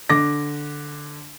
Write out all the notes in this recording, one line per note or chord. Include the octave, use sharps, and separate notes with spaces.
D3 D6 A#6